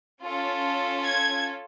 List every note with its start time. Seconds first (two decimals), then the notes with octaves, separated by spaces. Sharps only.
0.23 C#4 F4 A4
1.04 G#6